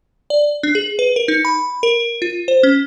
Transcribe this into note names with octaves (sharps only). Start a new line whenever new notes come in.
D5
D4
G#4
B4
A#4
D#4
B5
A#4
F4
C5
C#4